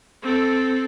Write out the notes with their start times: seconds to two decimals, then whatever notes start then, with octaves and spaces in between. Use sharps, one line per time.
0.23 C4 A4